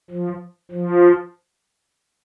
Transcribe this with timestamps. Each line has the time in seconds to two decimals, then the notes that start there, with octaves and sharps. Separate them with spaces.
0.11 F3
0.72 F3